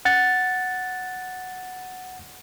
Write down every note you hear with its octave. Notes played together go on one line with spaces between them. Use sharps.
F#5 A6